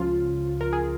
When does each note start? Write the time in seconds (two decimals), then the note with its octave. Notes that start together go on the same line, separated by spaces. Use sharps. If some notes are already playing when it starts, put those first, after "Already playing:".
Already playing: C#2 C#3 F3 F4
0.61 A#4
0.73 G#4